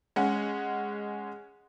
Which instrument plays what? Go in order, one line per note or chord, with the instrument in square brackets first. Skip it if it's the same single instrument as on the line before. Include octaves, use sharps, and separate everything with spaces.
[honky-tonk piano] G#3 C#4 F#5